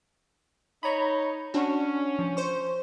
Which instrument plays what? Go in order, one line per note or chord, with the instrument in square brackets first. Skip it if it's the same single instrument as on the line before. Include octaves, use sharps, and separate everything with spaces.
[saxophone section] D#4 C#5 [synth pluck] A#5 B5
[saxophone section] C#4 [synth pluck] D4 F#4
[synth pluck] F3
C5 C#6